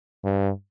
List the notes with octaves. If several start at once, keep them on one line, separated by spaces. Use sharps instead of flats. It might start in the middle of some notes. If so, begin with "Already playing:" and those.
G2